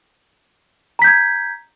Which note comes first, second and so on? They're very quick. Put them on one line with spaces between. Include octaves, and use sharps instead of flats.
A#5 B6 G6 G#6